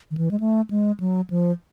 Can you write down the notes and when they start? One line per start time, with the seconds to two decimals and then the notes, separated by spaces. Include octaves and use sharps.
0.11 D#3
0.17 E3
0.31 G#3
0.40 A3
0.70 G#3
1.00 F#3
1.30 F3